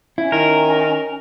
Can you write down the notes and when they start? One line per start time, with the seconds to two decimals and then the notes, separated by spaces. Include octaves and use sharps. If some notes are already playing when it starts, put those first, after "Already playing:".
0.18 C#4 E4
0.32 D#3 A#4